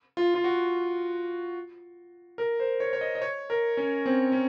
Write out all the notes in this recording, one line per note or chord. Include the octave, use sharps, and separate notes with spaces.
F4
F4
F#4
A#4
C5
C#5
C#5
D#5
D#5
C#5
A#4
C#4
C4
C#4